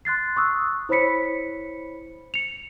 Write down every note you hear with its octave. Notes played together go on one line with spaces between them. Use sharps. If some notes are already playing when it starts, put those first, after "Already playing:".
C6 F#6 A6 C7
C#6 D#6 E6 F#6
E4 C5 C#5 B5 B6 C#7
C#7 F7